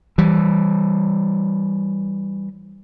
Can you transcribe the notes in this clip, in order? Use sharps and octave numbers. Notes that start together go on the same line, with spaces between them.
E3 G3